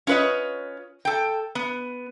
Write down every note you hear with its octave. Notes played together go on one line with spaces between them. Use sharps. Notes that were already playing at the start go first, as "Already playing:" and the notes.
C#4 F4 B4 C#5 D#5
A4 G5
B3